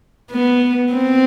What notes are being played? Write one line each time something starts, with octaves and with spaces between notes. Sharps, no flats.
B3
C4